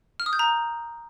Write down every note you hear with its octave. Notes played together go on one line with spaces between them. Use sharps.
F6
D#6
G6
A#5